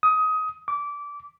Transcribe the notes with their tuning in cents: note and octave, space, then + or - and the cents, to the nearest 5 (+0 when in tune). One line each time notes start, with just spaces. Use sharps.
D#6 +20
D6 -20